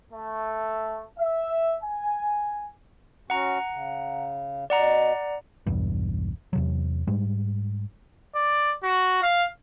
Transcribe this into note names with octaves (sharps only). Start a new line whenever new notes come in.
A3
E5
G#5
C#4 F#4 F#5 A#5
C#3
B2 D5 F#5 A#5
B1 E2 G2
E2 C3 F#3
G#2 G3 G#3
D5
F#4
F5